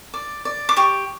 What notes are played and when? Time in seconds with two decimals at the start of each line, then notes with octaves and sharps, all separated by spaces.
0.14 D5
0.45 D5
0.69 D6
0.76 G4 C#6